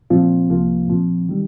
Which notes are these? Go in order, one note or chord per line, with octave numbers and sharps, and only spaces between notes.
A#2 F3 C4 F4
C2 C3 F3 A#3 F4
A#2 F3 C4
D#3 G3